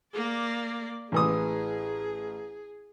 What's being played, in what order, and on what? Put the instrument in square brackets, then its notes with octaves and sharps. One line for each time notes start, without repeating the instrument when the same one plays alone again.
[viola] A#3 D5
[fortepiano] A1 E3 D#6 [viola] G#4